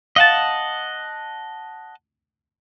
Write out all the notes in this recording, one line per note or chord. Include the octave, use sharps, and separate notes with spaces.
D#5 F5 F#5 A5 A6